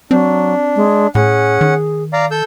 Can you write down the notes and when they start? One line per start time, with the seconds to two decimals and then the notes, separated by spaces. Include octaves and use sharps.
0.11 F#3 C4 D4
0.76 G#3
1.15 A2 C#4 G#4 F#5
1.61 D#3
2.13 D5 F5 A#5
2.31 A4 E6 G6